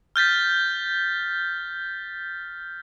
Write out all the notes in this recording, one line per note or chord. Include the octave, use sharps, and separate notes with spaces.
F6 G6 A6 B6